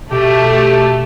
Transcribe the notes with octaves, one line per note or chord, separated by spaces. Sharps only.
B2 A3 G4